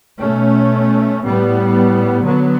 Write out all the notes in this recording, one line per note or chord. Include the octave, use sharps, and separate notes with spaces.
B2 A3 C#4
A2 G3 B3
D3 F#3 B3